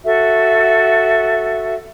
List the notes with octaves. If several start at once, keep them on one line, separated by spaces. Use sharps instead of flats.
F#4 A4 E5